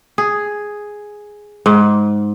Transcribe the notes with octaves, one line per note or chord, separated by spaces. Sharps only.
G#4
G#2